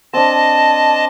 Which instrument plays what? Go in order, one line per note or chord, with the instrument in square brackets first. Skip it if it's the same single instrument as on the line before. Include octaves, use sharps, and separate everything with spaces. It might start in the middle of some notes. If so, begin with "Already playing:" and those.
[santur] C4 D4 [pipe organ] D#5 A5